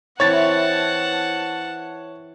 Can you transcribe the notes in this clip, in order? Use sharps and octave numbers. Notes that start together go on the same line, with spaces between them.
E3 C4 E4 C#5 F#5 A5 A6